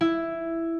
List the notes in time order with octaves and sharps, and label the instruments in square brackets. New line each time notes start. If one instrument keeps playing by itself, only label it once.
[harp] E4